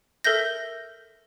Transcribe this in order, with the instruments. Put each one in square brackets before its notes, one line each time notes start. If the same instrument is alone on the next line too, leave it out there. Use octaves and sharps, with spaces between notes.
[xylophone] A4 A#4 E5 G6 A#6